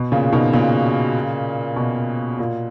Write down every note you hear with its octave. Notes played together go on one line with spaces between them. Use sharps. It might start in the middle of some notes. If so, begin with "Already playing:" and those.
Already playing: B2
A#2 C#3
B2 D#3
A#2 C#3
B2
A#2